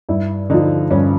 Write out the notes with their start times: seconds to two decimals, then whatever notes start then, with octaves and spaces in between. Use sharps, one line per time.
0.09 G2 E4
0.50 D3 F3 D#4
0.91 G2 C#4